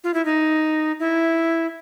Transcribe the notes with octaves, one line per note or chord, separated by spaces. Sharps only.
F4
E4
D#4
E4